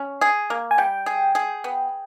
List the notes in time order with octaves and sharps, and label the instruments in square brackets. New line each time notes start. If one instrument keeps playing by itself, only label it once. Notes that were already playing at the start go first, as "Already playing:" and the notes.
Already playing: [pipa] C#4
G#4
A#3
[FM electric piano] G#5
[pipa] G3 [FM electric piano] G5
[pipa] G#4
G#4
B3